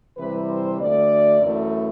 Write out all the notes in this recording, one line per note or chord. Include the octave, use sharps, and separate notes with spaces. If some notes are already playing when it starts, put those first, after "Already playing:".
C3 E3 G3 C4 B4
C5
D2 D3 A3 D5
F#2 E3 A3